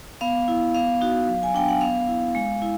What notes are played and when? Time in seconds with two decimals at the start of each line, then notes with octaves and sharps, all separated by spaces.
0.21 B3 F5
0.48 E4
0.74 B3 F5
1.01 D#4 F#4
1.28 F#3
1.43 G#5
1.54 B3 D4 G5
1.69 F#5
1.81 B3 F5
2.08 E4
2.35 G#3
2.62 E4